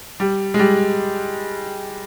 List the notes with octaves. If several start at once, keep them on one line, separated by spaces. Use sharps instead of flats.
G3
G#3
G3